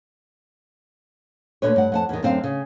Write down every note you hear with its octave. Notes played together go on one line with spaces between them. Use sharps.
D2 A#2 D3 B4 C#5
G2 F#5
F2 F#5 A5
E2 D#3
F#2 D3 C4 F5
C#3